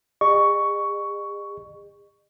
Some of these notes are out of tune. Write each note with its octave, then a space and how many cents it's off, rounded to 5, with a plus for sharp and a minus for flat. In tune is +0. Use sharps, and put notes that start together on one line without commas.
G#4 -45 D#5 -40 C#6 +10